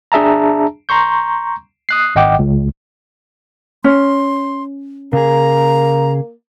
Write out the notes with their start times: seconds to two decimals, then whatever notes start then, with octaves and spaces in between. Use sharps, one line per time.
0.12 D4 G#4 E5 A5 A#5
0.89 A#5 C6 C#6 G6
1.89 D#6 F#6 C7
2.16 G#1 D#5 F#5 G5 D6
2.39 C#2
3.84 C#4 C6
5.13 C#3 A#3 G#4 A#5